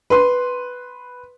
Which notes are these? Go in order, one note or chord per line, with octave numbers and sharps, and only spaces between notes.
B4 C6